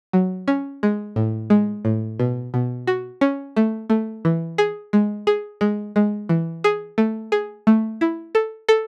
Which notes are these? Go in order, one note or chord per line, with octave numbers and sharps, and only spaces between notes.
F#3
C#4
G#3
A2
G#3
A2
B2
B2
F#4
C#4
A3
A3
E3
G#4
G#3
G#4
G#3
G#3
E3
G#4
A3
G#4
A3
E4
A4
A4